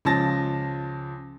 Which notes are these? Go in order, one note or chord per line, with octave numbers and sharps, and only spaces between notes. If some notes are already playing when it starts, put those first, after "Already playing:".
C#2 C#3 F3 A5 A6 A#6